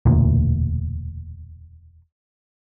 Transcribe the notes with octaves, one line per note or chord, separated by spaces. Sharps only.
E1 D2 A#2